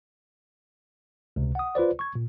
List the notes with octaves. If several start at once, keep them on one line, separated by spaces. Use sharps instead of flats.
C#2 C3
F#5 D#6
F4 B4 C5 D5
C#6 G#6
A#2